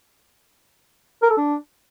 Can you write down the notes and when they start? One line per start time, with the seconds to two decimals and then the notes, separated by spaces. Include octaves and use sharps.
1.22 A#4
1.30 A4
1.37 D4